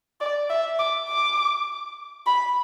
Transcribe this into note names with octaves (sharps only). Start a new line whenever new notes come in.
D5
E5
D6
D6
B5